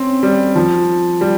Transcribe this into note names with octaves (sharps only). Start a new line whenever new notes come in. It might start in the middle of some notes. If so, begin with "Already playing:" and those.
Already playing: C4 C#4
G3
F3
G3